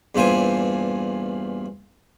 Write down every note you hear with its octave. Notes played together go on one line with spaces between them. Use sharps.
E2 G2 A#2 F4 C5 G#5